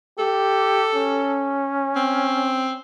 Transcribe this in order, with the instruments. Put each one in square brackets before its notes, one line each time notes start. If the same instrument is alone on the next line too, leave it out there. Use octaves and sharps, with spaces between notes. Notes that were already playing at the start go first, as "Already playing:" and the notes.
[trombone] G4 [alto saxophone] A4
[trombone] C#4
[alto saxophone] C4